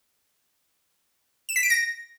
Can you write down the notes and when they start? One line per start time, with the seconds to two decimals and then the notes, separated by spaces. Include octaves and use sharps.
1.49 E7
1.56 B6
1.63 D7
1.70 A#6